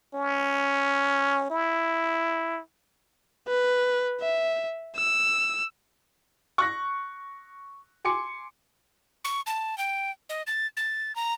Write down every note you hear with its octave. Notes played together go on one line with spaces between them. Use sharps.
C#4
E4
B4
E5
E6
C#6 F#6 A#6
G#5 C6 D6 C#7
C#6
A5
G5
D#5
A6
A6
A#5